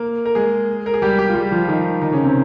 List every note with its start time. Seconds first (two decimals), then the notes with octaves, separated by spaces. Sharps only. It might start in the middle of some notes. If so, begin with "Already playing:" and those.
Already playing: A#3 A#4
0.25 A#4
0.35 G#3 G#4
0.86 A#4
0.94 G#4
1.02 G3 G4
1.19 G3 G4
1.29 F4
1.35 G3 G4
1.52 F3 F4
1.68 D#3 D#4
2.02 D#3 D#4
2.12 C#3 C#4
2.24 C3 C4